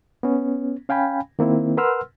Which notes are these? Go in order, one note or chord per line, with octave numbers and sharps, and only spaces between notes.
B3 C#4
C#4 F5 G5 G#5 B5
D#3 A#3 C4 E4
A#4 B4 F#5 C6 E6 F6